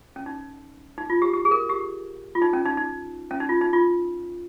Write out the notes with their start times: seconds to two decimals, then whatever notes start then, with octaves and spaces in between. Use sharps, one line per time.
0.16 C#4
0.26 D#4
0.98 D#4
1.10 F4
1.22 G4
1.34 G4
1.45 G#4
1.51 A#4
1.69 G4
2.35 F4
2.42 D#4
2.53 C#4
2.65 D#4
2.77 D#4
3.31 C#4
3.40 D#4
3.49 F4
3.61 D#4
3.73 F4